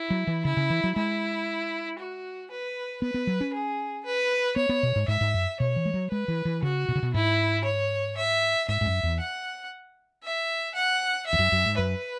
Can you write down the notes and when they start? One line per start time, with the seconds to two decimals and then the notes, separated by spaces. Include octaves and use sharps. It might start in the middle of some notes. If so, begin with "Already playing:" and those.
Already playing: E4
0.10 F#3
0.27 E3
0.45 C#3 E4
0.57 C#3
0.70 E3
0.84 F#3
0.96 G#3 E4
1.99 F#4
2.51 B4
3.02 B3 B4
3.14 B3
3.27 F#3
3.41 C#4
3.54 G#4
4.05 B4
4.56 B3 C#5
4.69 B3
4.83 B2
4.96 G#2
5.08 G#2 E5
5.21 G#2
5.34 F#2
5.60 B2 C#5
5.76 E3
5.85 G#3
5.94 F#3
6.12 G#3 B4
6.28 E3
6.45 E3
6.63 C#3 F#4
6.89 B2
6.96 C#3
7.03 B2
7.14 G#2 E4
7.65 C#5
8.17 E5
8.68 G#2 E5
8.81 G#2
8.86 F#2
9.03 E2
9.20 F#5
10.24 E5
10.75 F#5
11.27 E5
11.33 E2
11.39 F#2
11.52 F#2
11.66 G#2
11.78 F#2 B4